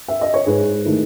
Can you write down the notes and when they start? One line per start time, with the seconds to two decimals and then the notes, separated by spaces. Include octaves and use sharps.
0.08 E5
0.21 D#5
0.34 C#5
0.46 G#2 G#4 B4
0.85 D#3 A3 E4